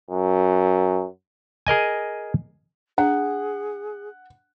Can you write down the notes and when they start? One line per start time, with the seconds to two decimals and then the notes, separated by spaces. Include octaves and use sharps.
0.11 F#2
1.67 G#4 A#4 D#5 G#5
2.98 D4 G#4 F#5